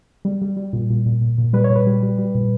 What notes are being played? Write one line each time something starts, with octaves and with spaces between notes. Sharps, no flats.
G3
G3
G3
A#2
A#2
A#2
A#2
A#2
G3 B4
C#5
A#2
B4
G3
G3
G3
A#2